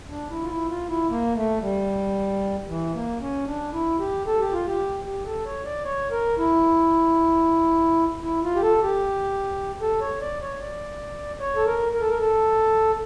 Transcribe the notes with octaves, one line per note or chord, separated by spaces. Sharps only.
D4
E4
F4
E4
F4
E4
A#3
A3
G3
E3
A#3
C#4
D4
E4
G4
A4
G4
F4
G4
G4
A4
C#5
D5
C#5
A#4
E4
E4
F4
G4
A4
G4
A4
C#5
D5
C#5
D5
C#5
A4
A#4
A#4
A4
A#4
A4